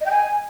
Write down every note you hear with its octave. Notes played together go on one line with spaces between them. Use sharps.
D#5
G5
G#5